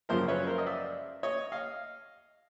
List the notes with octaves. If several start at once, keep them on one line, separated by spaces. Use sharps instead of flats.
F#2 C#3 F3 G#3 A#4 C5
B4 C#5
A#4 C5
D#5
D5 E5
C#5 D#5
D#5 F5